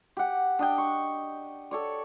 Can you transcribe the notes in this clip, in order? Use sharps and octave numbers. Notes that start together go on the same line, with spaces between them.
G4 F#5
D4 D#5 G5
C#6
A4 C#5 D5